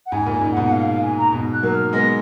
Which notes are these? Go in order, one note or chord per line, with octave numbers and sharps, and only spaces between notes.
F#5
G#2 G#5
A#2
G#5
G#2
F#5
G#2 B2
F#5
F5
F5
G#5
A#5
G#2 B2
F#6
F#3 A#3
F6
G#3 B3 A#6